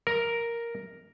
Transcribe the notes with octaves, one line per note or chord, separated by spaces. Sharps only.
A#4